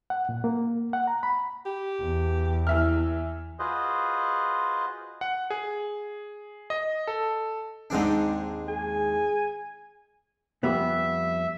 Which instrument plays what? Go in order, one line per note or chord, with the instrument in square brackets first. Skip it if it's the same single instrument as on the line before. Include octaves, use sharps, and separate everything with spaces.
[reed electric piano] F#5
A#2
A#3
F#5
A#5
B5
[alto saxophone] G4
[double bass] E2
[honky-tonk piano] E3 E5 F6
[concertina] F4 F#4 G#4 B4 C5 D#5
[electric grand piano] F#5
G#4
D#5
A4
[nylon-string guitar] D#2 G#3 D#4 [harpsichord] G#2 C4 D4
[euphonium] G#4 [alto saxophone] G#5
[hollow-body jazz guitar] F2 G3 B3 [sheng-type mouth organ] E5